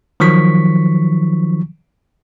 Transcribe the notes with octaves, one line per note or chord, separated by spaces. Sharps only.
D#3 F3 F#3 C#6 B6